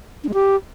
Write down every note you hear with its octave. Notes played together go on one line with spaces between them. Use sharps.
D4
G#3
G4